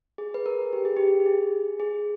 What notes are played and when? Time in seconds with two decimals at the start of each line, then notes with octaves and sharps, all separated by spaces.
0.18 G#4
0.34 B4
0.46 A#4
0.73 G4
0.85 G#4
0.97 G4
1.26 G#4
1.80 G#4